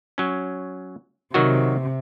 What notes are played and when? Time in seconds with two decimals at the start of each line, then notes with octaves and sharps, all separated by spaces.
0.18 F#3 C#4
1.34 C3 D#3 F#3 F#4